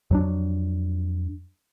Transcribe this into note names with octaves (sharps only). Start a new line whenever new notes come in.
F2 F#3 D4